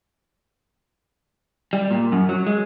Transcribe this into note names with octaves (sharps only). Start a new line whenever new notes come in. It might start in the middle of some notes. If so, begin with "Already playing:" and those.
G3
A#2
F#2
F#3
G#3